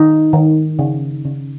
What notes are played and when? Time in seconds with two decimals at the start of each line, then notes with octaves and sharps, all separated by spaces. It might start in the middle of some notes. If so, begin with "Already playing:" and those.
Already playing: D#3 D#4
0.33 D#3
0.79 C#3
1.25 C#3